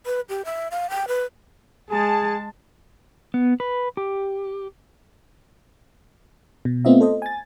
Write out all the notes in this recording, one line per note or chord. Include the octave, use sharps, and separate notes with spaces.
B4
G4
E5
F5
G5
B4
G#3 G#4 A5
B3
B4
G4
B2
A3 B3 C4 F4 D#5 E5
A4 C5 D#5
G#5 A6